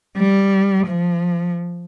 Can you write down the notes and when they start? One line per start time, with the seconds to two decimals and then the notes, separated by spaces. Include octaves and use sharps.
0.17 G3
0.87 F3